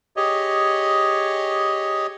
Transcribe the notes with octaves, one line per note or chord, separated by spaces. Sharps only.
G4 G#4 C#5 D#5